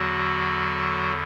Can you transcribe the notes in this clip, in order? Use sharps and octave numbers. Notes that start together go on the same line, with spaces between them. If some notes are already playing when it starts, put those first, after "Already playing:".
Already playing: E2 D3 F#3 F#4